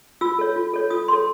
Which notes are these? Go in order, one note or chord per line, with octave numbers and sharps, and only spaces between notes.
F4 E6
A4 C#5
F4
A4 C#5
F4 D#6
A4 C#5 C6